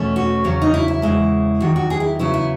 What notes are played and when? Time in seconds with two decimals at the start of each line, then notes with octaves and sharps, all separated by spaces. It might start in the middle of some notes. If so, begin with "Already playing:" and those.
Already playing: E2 B2 A3 C#4
0.16 F#4
0.44 E2 C#3 F#3 C#4
0.62 D#4
0.74 E4
0.88 E4
1.02 E2 C#3 G#3 E4
1.60 E2 D#3 F#3 F#4
1.76 F#4
1.90 G#4
2.00 E4
2.19 E2 C#3 F#3 B3 E4
2.34 E4